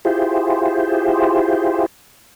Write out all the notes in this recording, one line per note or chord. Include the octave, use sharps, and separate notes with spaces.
E4 F4 G4 G#4 C5